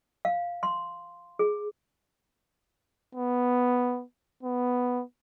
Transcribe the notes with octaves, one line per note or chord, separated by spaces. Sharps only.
F5
C6
G#4
B3
B3